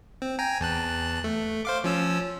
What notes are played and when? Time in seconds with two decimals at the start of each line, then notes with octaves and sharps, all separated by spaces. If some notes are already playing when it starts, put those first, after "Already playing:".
0.22 C4
0.39 G5 G#5 A#5
0.60 E2 A5 F#6
1.24 A3
1.65 C5 F5 D6
1.84 F3 C#4 E6